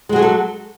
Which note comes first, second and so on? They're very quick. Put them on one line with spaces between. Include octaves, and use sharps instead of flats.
G#3 F#3 G#4 F#4 A4